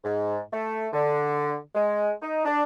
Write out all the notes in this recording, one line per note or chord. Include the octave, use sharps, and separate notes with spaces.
G#2
A3
D3
G#3
D#4
D4